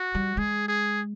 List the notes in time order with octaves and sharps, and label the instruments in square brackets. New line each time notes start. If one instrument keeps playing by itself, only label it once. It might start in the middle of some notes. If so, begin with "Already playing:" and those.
Already playing: [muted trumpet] F#4
[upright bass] G3
[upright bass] G#3 [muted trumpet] G#4
[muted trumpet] G#4